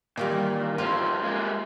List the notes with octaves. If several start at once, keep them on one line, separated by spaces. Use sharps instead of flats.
A#2 D#3 E3 G3
G2 F3 F4
G#3 A#3